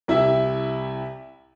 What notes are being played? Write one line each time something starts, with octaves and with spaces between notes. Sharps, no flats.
C2 E4 G4 E5